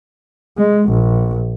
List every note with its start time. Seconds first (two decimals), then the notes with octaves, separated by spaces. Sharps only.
0.58 G#3
0.90 A#1